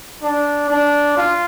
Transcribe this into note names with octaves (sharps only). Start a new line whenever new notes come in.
D4
D4
F4